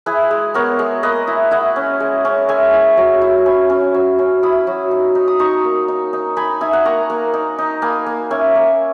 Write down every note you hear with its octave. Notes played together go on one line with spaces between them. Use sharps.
E4 G#4 B4
G#3
B3 A#4 C#5
G#3
A#3 B4 D#5
E4
E4 D#5 F#5
C#4
G#3
C#4
G#3 E5 G#5
E4
F#3
E4
C#4 G#5 B5
C#4
F#3
C#4
E4 B5 D#6
F#3
D#4
D#4
D#6
D#4 A#5 C#6
A#3
D#4
D#4
D#4 G#5 B5
D#4 E5 G#5
F#5 A#5
A#3 A#5 C#6
A#3
D#4
D#4
A#3 G#5 B5
A#3
C#4 E5 G#5
A#3